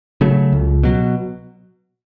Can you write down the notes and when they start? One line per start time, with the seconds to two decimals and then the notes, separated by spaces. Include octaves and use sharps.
0.21 C#3 F#3 A3
0.52 C#2
0.83 B2 F#3